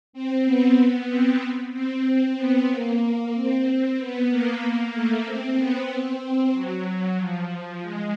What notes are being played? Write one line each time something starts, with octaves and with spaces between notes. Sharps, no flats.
C4
B3
B3
C4
C4
B3
A#3
C4
B3
A#3
A3
C4
B3
C4
C4
F#3
F#3
F3
G#3